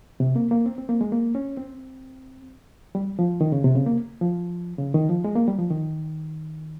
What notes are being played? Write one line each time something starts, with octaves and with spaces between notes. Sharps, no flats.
C3
A#3
A#3
C4
C4
A#3
G#3
A#3
C#4
C4
G3
F3
D#3
C#3
C3
C#3
A#3
F3
C#3
D#3
F3
G#3
A#3
G3
F3
D#3